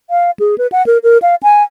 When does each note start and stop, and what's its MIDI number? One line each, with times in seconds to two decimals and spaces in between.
0.10 0.31 77
0.40 0.58 68
0.58 0.67 71
0.72 0.85 78
0.87 0.98 70
1.03 1.18 70
1.22 1.35 77
1.43 1.63 80